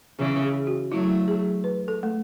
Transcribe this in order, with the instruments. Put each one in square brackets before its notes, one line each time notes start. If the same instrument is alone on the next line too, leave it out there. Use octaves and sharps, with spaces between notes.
[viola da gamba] C#3 E3 [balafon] G#4
[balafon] G#4
F#4
[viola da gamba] F#3 A3 [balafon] E4
[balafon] G#4
B4
A4
A3